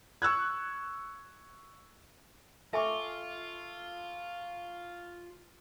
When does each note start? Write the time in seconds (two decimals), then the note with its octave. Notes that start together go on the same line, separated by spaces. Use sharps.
0.22 C#6 E6 F#6 G#6
2.73 F4 A4 E5 G#5 A5 C#6 D6